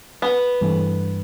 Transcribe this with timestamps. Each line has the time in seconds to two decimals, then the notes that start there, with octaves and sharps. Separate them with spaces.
0.22 B3
0.61 G2 E3 A3